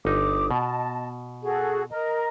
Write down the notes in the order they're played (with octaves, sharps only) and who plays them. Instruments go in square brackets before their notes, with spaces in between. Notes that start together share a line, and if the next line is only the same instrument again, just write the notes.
[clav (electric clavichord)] G1 D#4 [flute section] D6 D#6
[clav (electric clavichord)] B2 [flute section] D#5 A5
[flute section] F#4 G#4 A4
A#4 D#5 A#5